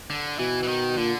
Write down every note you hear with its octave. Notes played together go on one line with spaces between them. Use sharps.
D3
B2 E3
E3
D#3
A#2 D3